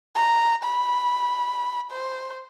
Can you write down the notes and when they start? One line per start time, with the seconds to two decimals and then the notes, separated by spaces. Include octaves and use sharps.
0.15 A#5
0.64 B5
1.91 C5